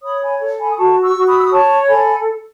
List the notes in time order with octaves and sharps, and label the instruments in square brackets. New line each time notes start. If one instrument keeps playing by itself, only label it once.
[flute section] C#5 B5 D#6
G#5 B5
A4
G#5 B5
D#6
F#4 A5 C#6
C#6 E6
F#4
B5 D#6
E6
D#6
C#5 A5 C#6
A4 G#5 B5